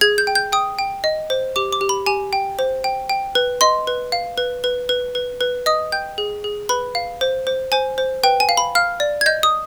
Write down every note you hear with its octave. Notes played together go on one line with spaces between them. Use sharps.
G#4 G#6
G6
G5
G6
G5 D#6
G5
D#5
C5
G4 D6
D6
G4
B5
G4 G#5
G5
C5
G5
G5
B4
D#5 C6
B4
F5
B4
B4
B4
B4
B4
D#5 D#6
G5 G6
G#4
G#4
B4 B5
F5
C5
C5
C5 G#5
C5
B4 G5
G#5
F5
B5
F5 F6
D5
G#6
D#5 G6
D#6